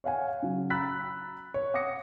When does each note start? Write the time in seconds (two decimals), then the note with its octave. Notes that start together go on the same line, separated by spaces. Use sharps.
0.04 C#5 F5 F#5 G#5
0.43 C#3 F#3
0.70 A#5 B5 E6 F#6 A6 B6
1.54 C#5
1.74 F#5 D6 D#6 A#6 C#7